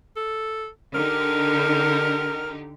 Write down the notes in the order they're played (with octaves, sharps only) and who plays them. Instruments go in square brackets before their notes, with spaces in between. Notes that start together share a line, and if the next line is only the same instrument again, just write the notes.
[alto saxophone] A4
[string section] D3 D#4 G4 [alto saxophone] A#4